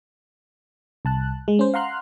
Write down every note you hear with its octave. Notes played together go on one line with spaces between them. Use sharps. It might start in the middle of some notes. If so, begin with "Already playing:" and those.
C2 A5 F#6
G#3
C#4 C5
F5 F#5 A#5 C6 F6 F#6